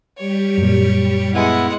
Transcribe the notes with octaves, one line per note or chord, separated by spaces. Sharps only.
G3 G4 C#5
F#2 A#2
G#3 B3 E4 F#5